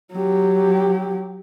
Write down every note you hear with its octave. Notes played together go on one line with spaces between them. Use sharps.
F#3 G4